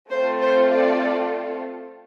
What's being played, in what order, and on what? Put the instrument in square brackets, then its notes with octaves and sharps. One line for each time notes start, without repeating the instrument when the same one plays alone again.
[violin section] A3 C4 F4 A4 C5
C5
D5